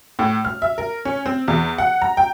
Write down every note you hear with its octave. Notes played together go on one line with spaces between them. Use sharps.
A2
F6
E5
A#4
C#4
C4
E2
F#5
A#5
G5